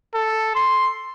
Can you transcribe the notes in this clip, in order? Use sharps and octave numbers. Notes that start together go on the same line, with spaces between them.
A4
C6